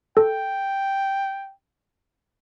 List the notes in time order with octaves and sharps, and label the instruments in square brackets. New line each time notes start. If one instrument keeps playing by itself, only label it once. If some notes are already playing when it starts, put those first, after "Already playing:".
[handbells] A4 [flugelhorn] G5